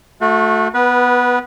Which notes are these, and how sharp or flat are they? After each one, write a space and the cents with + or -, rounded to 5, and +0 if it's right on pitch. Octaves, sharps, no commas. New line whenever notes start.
A3 +0 F#4 -35
B3 +0 B4 -20